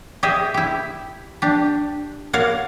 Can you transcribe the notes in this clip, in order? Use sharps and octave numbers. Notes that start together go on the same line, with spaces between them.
G4 G#4 D#5 E5 G#5
E4 G4
D4 G4
A#3 F#4 C#5 D5 F5